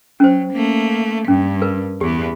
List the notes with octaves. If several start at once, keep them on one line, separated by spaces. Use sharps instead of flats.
F#3 C#4 C5
A3 A#3
G2 C#4
A#4 B4
E2 B3 G4 G#4